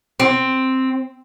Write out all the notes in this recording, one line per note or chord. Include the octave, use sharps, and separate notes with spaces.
C4